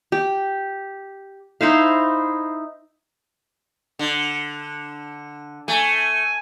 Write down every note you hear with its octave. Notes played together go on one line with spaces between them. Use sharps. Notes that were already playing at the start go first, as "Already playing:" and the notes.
G4
D#4 E4 C5 F5
D3
A3 G#5